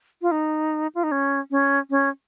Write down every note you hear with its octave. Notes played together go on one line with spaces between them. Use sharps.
F4
D#4
F4
D#4
C#4
C#4
C#4